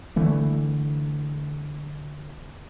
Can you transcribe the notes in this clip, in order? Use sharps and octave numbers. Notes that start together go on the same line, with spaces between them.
D3 E3 A3